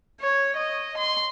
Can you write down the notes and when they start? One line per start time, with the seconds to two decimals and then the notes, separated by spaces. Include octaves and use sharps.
0.21 C#5
0.56 D#5
0.97 C6